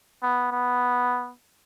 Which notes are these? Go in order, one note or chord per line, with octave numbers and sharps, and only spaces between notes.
B3
B3